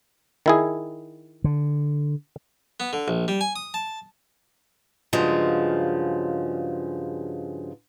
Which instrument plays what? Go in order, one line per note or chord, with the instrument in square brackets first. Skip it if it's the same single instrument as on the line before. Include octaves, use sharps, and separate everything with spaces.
[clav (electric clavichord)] D#3 E4 G#4
[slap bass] D3
[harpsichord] B3
D3
A#1
G3
G#5
D#6
A5
[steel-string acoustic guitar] G2 C#3 F3 F#3 G#3